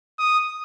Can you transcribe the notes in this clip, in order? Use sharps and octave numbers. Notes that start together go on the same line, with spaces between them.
D#6